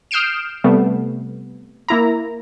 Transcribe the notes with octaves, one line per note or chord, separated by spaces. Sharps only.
D#6 F6 G6 C7 D7 E7
C3 G3 A3 B3
A#3 E4 A#5